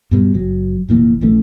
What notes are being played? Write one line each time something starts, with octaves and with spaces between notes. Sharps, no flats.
G2 B2 G3
F#1 F#3
F1 A#2 E3 A#3
A#1 E3 A3 C#4